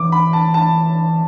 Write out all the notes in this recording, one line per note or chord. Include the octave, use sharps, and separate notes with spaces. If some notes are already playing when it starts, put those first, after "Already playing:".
Already playing: E3 D6
B5
A5
A5